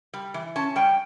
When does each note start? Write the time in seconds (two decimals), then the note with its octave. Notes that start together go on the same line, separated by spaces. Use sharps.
0.14 G3
0.34 E3
0.56 C#4 A5
0.76 G3 G5